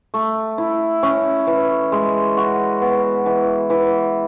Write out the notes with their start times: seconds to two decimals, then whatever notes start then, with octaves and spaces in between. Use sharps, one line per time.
0.14 A3
0.58 E4
1.03 C#4
1.47 E3
1.92 G#3
2.37 F#4
2.82 B3
3.26 E3
3.70 E3